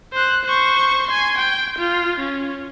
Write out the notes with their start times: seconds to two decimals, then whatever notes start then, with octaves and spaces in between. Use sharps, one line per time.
0.13 C5 F#6
0.45 C5 C#6
1.07 G#5 C6
1.38 G5
1.79 F4
2.19 C#4